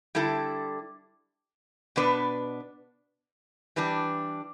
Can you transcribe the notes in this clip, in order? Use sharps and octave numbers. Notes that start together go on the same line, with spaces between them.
D3 G3 E4 A4
B2 B3 D4 B4
E3 G3 D4 B4